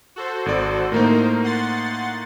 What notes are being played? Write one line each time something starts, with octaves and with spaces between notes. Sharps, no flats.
F#4 A4 C5
G#1 D5
A2 A#3 D#4 A#4 C5
F#5 C6 A6